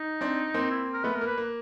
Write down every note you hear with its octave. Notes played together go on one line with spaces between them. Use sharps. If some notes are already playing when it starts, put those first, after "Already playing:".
Already playing: D#4
C4 D4
A#3 C4
E4
A#4
A3 B3 B4
A#4
A#3
B4
A#3